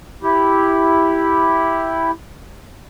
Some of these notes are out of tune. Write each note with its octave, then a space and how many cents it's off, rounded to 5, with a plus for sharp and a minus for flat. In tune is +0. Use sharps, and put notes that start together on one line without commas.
E4 +0 G4 +0